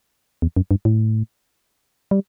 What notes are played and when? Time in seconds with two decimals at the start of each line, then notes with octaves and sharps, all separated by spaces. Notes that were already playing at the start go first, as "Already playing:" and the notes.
0.42 E2
0.57 F#2
0.71 G2
0.85 A2
2.11 G3